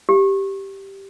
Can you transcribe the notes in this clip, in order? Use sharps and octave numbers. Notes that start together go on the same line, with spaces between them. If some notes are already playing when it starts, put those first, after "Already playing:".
G4